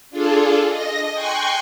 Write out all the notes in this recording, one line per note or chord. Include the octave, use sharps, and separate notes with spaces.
D4 F4 G#4 A4
D#5 A#6
G5 G#5 C6 C#6 F#6 G#6